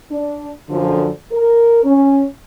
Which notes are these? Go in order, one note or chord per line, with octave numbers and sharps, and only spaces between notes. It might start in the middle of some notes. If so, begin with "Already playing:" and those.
D4
F#2 D3 F3
A#4
C#4